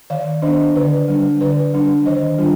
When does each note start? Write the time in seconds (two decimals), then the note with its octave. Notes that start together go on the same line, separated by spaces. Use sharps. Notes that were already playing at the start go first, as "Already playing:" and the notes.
0.10 D#3 D5 F5
0.42 D4 C5 D#5
0.47 B3
0.75 D3 B4 D5
1.08 G3 D4
1.41 D3 B4 D5
1.74 G3 D4
2.06 D#3 C5 D#5
2.38 G3 D4 F4